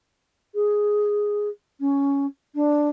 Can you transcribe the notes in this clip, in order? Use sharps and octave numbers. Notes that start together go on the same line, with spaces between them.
G#4
C#4
D4